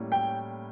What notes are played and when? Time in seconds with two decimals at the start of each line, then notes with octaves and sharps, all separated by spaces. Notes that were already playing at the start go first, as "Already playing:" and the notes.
Already playing: A2 G3 A#3 C#4
0.12 G5